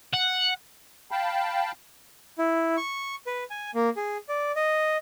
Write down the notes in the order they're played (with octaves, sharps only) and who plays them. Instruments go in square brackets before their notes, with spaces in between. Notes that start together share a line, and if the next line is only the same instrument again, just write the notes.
[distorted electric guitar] F#5
[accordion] F5 G5 A5 B5
[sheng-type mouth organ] E4
C#6
B4
G#5
A#3
G#4
D5
D#5